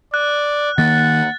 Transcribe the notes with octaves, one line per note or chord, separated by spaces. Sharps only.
D5 F#6
D#3 A#3 F#5 A6